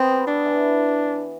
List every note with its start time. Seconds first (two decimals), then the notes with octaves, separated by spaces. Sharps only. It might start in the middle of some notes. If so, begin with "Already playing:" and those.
Already playing: B3 C4
0.10 G3
0.27 F#3 D4
0.45 E3